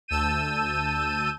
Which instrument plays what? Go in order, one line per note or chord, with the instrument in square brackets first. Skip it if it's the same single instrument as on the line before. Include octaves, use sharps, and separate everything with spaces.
[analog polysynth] D2 A5 E6 G6 D#7